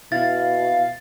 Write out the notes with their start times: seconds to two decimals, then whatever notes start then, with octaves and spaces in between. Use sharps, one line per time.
0.12 B2 E4 F5 A6